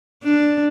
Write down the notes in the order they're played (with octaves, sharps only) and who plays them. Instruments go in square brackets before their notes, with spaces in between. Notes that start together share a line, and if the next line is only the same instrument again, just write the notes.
[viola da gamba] D4